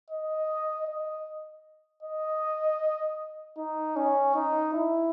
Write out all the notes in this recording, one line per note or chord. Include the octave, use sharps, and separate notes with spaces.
D#5
D#5
D#5
D#4
C#4
D#4
E4